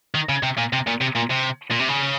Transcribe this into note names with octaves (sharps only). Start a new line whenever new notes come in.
D#3
C#3
C3
A#2
C3
A#2
C3
A#2
C3
A#2
C3
C#3